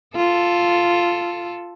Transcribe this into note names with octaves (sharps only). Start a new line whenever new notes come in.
F4 A4